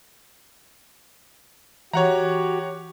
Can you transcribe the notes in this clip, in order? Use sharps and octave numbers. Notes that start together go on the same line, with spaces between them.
E3 F#4 G4 C#5 F#5 A#5